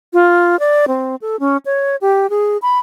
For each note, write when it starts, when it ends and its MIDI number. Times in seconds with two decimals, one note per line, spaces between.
0.13 0.59 65
0.59 0.85 74
0.88 1.16 60
1.22 1.36 69
1.40 1.57 61
1.66 1.96 73
2.01 2.29 67
2.30 2.57 68
2.62 2.78 83